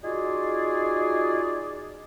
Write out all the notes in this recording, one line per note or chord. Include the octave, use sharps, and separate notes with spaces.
D#4 F4 F#4 G#4 D5